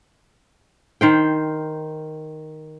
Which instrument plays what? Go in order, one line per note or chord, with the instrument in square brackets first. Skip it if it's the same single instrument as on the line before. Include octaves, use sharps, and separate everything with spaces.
[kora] D#3 C5 G5